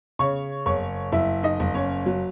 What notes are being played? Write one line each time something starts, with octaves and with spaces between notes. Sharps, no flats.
C#3 C#5 C#6
F#1 C#5 C#6
F#1 E4 E5
D#4 D#5
F#1
C#4 C#5
F#3